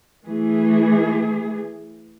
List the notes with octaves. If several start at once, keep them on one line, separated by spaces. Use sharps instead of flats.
E3 A3 G#4